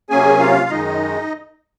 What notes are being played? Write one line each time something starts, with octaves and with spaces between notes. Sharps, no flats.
C3 F#3 A#3 C#4 G#4 G#5
F4 F5
F#2 D#3 G#3 D#4 D#5